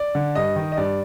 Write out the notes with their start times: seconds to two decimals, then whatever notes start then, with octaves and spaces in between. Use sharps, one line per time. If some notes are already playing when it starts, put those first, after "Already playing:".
Already playing: D5
0.15 D3
0.35 G2 D#5
0.56 D#3
0.72 D#5
0.77 G2 D5